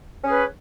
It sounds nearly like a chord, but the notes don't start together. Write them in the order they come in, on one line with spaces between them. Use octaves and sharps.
C#4 G#4 B4